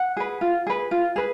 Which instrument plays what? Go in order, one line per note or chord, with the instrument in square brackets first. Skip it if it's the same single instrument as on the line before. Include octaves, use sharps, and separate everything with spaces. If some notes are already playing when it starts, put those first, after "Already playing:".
Already playing: [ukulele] F#5
G#4 B4
F4
G#4 B4
F4
G#4 B4